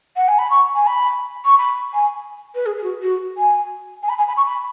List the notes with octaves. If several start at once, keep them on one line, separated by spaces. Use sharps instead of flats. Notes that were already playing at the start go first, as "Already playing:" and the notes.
F#5
G#5
B5
C#6
G#5
B5
C#6
B5
G#5
B4
G#4
G#4
F#4
F#4
G#5
G#5
B5
G#5
B5
C#6
B5